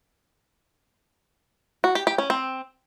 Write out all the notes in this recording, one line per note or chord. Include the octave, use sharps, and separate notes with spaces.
F#4
G4
G4
C#4
C4